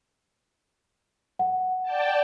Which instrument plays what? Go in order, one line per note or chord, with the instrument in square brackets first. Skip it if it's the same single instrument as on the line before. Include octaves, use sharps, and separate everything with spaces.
[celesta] F#5
[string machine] D5 G5 A5